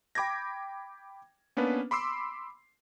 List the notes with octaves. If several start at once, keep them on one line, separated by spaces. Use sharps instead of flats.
G5 B5 D6 G6 G#6 A#6
A#3 B3 C#4 D4 B4
B5 C6 D6 E6 C7